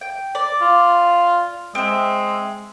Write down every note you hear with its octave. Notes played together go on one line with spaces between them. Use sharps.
G5
D5
F4
G#3 C4 E5